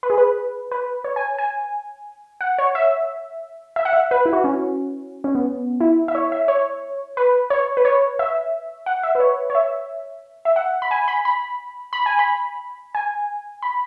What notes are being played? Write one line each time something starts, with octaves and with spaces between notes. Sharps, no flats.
B4
G#4
B4
B4
C#5
G#5
G#5
F#5
C#5
E5
E5
F#5
E5
B4
E4
F#4
C#4
C#4
B3
E4
E5
C#5
E5
C#5
B4
C#5
B4
C#5
E5
F#5
E5
B4
C#5
C#5
E5
E5
F#5
B5
G#5
B5
B5
B5
G#5
B5
G#5
B5